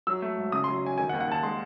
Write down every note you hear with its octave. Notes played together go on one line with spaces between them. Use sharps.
F#3 E6
A3
G#2
C#3 D#6
C6
F#3
C#4 G#5
D#3 G#5
F#5
D#2
F#5
D#2 A5
G#3 C6